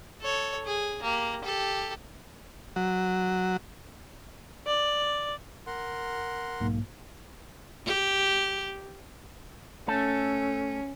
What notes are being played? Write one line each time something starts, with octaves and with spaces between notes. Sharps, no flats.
A4 C#5
G#4
A#3 G4
G4 A4
F#3
D5
A#4 F#5 C6
B1 G#2 A#3
G4
A3 C#4 A4